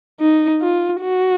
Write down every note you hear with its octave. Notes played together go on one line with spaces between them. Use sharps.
D#4
F4
F#4